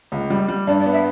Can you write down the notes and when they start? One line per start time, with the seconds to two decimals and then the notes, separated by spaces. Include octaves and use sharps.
0.12 C#2
0.30 G3
0.48 G3
0.67 G2 D5
0.80 D5
0.86 B3
0.93 E5